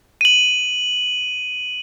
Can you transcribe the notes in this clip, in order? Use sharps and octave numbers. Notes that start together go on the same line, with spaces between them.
D#7 F#7